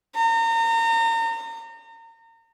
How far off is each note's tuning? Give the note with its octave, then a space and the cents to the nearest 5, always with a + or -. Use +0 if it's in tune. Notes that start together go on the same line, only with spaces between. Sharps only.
A#5 -35